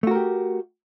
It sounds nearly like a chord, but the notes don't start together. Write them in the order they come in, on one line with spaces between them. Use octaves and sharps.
A3 F#4 A#4 G4